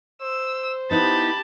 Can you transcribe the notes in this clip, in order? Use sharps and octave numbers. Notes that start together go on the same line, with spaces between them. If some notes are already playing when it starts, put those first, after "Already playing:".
C5 E6
B3 D#4 E4 G4 A5 B5